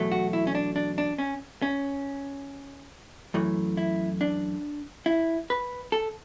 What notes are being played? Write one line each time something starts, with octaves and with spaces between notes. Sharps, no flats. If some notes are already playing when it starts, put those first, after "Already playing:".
Already playing: E2 B2 F#3 A3
F#4
E4
C#4
D4
D4
D4
C#4
C#4
F#2 E3 A3
E4
D4
E4
B4
A4